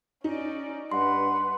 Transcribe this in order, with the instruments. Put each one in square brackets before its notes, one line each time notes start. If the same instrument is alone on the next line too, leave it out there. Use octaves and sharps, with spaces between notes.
[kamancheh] C#4 D5 [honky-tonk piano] D#4 D#5
[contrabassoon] G2 [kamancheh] B4 F#5 [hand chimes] C6